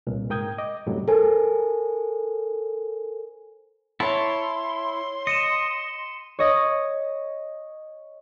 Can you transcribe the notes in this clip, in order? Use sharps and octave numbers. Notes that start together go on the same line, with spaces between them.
C2 A#2
G#2 A#4 G5 D#6 G6 G#6
D#5 D6
F#2 A2 C3 F#3 G3
A4 A#4 C5 G#5
E4 C#5 A5 C6
D#5 C#7 D#7 E7
C#5 D#5 D#6